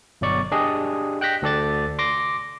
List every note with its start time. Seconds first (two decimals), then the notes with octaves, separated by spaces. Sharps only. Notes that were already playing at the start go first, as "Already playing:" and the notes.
0.21 G1 B2 F#3 D5 C#6
0.52 D4 G4 G#4 D#5
1.21 G5 F#6 G6 A#6 B6
1.42 D2 A4 D5 A6
1.99 C6 D6 A#6